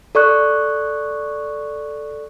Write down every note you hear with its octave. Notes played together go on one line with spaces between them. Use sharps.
A4 D5 C#6 F#6